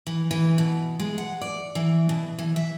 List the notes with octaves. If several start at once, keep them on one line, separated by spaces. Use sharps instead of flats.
E3
E3
B2
G#3
F#5
D5
E3
B2
E3
E5